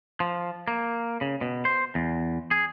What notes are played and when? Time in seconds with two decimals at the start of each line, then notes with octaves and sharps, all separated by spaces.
0.20 F3
0.68 A#3
1.21 C#3
1.41 B2
1.65 C5
1.95 E2
2.51 G#4